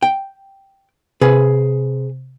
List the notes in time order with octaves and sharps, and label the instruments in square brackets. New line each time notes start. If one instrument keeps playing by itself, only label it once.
[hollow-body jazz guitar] G5
[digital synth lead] C3 [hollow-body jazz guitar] G#4 B4